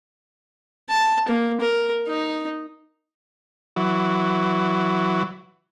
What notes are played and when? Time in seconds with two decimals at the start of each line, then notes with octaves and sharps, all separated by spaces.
0.90 A5
1.29 A#3
1.61 A#4
2.08 D#4
3.76 E3 F#3